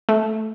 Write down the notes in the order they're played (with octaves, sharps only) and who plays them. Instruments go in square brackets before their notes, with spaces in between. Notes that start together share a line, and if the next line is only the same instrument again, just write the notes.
[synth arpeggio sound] A3